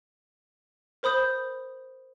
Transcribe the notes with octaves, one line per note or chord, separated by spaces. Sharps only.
A#4 C5 B5 D#6 G6